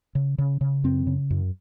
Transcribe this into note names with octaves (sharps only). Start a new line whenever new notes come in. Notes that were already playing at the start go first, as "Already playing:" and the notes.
C#3
C#3
C#3
F#2 C4
C#3
F#2